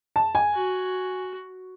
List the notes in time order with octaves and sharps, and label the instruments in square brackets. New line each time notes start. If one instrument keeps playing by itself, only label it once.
[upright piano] A5
G#5
[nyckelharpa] F#4